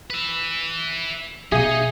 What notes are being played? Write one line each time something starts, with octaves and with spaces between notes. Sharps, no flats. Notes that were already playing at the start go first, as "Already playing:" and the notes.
B4 E5
B2 D#4 G#4 E5 F5 D#7